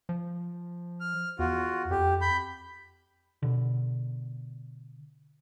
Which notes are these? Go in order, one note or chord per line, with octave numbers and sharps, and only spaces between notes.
F3
F6
E2 F4 F#4
F2 G4
B5 G6
B2 D3